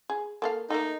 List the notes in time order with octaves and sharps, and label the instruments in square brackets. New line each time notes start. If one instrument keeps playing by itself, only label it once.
[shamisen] G#4
A#3 A4 F5
[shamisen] A3 A#3 [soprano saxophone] D#4